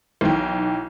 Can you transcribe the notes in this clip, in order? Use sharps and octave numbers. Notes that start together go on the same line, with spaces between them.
B1 E3 D#4 G5